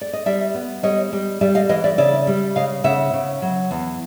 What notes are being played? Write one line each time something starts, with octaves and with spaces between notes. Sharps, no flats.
D5
D#5
G3 D5 E5
B3
G3 C#5 D#5
G3
G3 D5 E5
D#5 F5
E3 D#5 F5
D5 E5
C#3 D5 E5
G3
C#3 D#5 F5
C#3 E5 F#5
C#3
F#3
E2